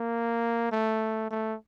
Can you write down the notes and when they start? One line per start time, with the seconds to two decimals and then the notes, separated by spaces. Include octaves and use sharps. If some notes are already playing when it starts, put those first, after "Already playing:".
Already playing: A#3
0.72 A3
1.31 A3